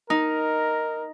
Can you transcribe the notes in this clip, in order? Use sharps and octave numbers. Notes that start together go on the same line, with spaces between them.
D#4 A#4